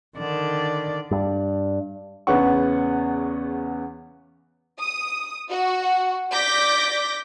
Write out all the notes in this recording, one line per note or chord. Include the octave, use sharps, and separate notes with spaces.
D3 D#3 D5
G2
E2 C#3 B3 C#5 F#5 C#6
D#6
F#4
D5 D6 G6 A#6 B6